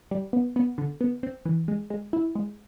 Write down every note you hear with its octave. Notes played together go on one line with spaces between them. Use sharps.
G3
B3
B3
D3
B3
C4
E3
G#3
G#3
E4
G#3